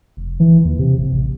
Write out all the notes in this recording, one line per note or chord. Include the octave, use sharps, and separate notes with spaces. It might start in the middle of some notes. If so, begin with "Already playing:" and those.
F1
E3
D#2
C3
G1
A1